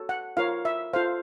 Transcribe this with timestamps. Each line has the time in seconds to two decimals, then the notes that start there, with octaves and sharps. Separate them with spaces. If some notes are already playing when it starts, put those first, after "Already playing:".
Already playing: F#4 A4 C#5
0.09 F#5
0.37 F4 A#4 C#5 F5
0.65 E5
0.93 F4 A4 C5 F5